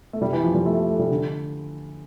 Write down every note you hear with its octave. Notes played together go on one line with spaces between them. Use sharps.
A3
G3
E3
F3
G3
A3
A3
A3
G3
D3